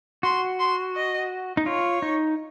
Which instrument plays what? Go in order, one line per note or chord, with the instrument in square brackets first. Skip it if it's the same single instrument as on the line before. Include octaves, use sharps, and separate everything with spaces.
[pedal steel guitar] F#4 [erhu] C6
[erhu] C6
D#5
[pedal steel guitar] D#4
[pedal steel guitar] F4 [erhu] C#5
[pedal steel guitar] D#4